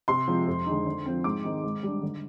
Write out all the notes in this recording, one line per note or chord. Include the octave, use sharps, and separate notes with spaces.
C3 C6
F3 G#3 C4
F2
D3 G#3 D#4
D3
F3 C4
G#2 D6
D#3 G#3 C4 D#4
G#2
G3 D4
D3